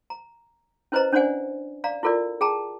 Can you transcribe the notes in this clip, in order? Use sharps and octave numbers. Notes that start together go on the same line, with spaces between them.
A#5
C#4 E4 B4 C5 D#5 A#5
C#4 D4 C5 D5 F#5 G#5
D5 F5 A#5
E4 F4 A4 A#4 D5
G#4 G5 A5 A#5